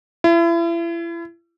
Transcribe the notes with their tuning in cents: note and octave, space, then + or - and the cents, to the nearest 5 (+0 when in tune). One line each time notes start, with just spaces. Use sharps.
E4 +35